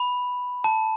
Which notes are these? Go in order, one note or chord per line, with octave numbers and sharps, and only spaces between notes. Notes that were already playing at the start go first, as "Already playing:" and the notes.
Already playing: B5
A5